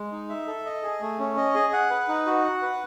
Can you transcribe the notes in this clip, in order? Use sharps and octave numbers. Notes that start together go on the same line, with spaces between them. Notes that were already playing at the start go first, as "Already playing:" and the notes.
Already playing: G#3
D#4
E5
A4
D#5
G#4
A3
C#4
D#5
G#4
F#5
B4
D#4
F#4
F#5
B4